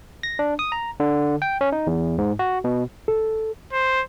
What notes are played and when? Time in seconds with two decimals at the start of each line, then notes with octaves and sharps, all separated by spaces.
0.23 A#6
0.39 D4
0.59 D#6
0.72 A#5
1.00 D3
1.42 G5
1.61 C#4
1.72 D#4
1.87 E2
2.18 G#2
2.39 F#4
2.64 B2
3.08 A4
3.72 C5